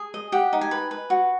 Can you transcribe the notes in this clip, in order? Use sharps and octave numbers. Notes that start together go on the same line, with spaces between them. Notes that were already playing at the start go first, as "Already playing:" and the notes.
Already playing: G#4
D#5
G4 F#5
D#4
G#5
B4
B4
F#4